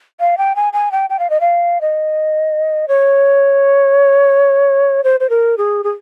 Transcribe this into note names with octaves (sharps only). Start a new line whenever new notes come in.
F5
G5
G#5
G#5
G5
G5
F5
D#5
F5
D#5
C#5
C5
C5
A#4
G#4
G#4